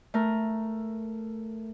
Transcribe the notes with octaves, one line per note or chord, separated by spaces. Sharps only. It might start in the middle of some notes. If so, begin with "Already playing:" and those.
A3 A#4